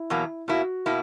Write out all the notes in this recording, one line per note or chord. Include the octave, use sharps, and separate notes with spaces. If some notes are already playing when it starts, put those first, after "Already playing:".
Already playing: E4
E2 B2 F#3 A#3
B2 A#3 E4 F#4
B2 A#3 E4